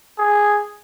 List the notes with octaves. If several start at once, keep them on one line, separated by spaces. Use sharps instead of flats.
G#4